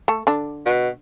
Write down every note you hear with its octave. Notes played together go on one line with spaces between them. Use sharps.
A3 A4
D3 D4
B2